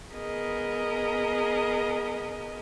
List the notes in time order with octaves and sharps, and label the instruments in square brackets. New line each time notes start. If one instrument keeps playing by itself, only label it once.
[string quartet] B3 G#4 A#4 D#5